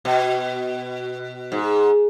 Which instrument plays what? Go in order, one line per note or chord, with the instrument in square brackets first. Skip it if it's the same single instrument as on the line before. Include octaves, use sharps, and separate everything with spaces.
[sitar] B2
G#2